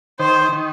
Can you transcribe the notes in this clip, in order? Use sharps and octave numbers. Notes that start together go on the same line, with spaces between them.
D#3 C5
D#3